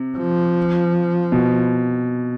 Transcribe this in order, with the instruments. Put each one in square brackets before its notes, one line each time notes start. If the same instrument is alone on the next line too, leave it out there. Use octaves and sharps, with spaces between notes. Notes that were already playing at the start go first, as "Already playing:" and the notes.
Already playing: [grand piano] C3
[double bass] F3
[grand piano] B2